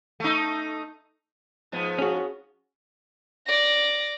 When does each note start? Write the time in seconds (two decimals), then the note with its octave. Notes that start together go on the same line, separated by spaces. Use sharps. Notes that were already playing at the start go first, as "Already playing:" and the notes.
0.20 A3 D#4
1.72 G#2 F3 B3
1.98 C#4 F#4 G#4
3.46 D5 A#6